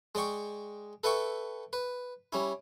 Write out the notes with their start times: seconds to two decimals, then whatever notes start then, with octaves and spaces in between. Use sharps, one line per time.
0.15 G#3 D5 G5 C#6
1.04 A4 B4 E5 G5 C#6
1.73 B4
2.33 G3 C#4 E4